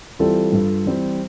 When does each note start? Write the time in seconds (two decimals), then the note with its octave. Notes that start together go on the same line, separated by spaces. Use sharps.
0.19 E3 G3 C4 F4 A4
0.52 G2
0.85 E3 G3 C4